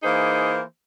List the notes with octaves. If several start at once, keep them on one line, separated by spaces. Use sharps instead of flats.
E3 A#3 D#4 G#4 C5